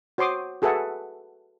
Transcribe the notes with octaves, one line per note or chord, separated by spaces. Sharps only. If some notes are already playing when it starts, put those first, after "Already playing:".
F#4 C5 C#5 C6 D6 D#6
F#4 G#4 A4 B4 E5 F#5